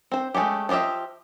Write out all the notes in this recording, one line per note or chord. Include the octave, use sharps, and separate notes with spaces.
C4 C5
G#3 A3 C#4 G4
F3 F4 G4 D#5 E5